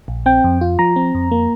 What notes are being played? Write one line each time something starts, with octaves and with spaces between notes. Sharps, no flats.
A#1
C4 G5
F2
F4
F3 A#5
C4
F2
A#3